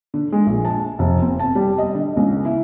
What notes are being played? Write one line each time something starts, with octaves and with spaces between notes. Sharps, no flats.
D3
G#3
A#1
A5
F1
C4
A5
G3
D#5
D3
C#2
E4